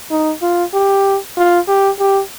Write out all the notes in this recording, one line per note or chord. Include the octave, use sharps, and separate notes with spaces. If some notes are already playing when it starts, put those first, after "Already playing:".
D#4
F4
G4
F4
G4
G4